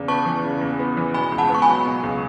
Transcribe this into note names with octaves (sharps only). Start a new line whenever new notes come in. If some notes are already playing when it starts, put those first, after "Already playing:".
Already playing: E2 C#3
B3 A5 C#6
E3
C#3
E2
B3
E3
B2 G#5 B5
C#2
F#5 A5
B3 C#6
G#5 B5
F#3
B2
C#2